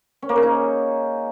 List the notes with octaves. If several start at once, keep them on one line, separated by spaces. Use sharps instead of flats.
C#4
A#3
C#3
D#4